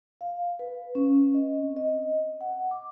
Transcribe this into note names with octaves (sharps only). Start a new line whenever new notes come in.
F5
B4
C#4
D#5
C4
D#5
F#5
D6